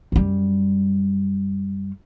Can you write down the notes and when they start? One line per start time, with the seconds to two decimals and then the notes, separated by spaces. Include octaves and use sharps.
0.12 F#2 G3